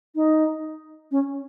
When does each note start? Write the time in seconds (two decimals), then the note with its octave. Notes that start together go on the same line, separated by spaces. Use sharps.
0.15 D#4
1.11 C#4